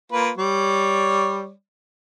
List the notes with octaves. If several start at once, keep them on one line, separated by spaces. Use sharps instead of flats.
A#3 F4 B4
G3 C#5 D5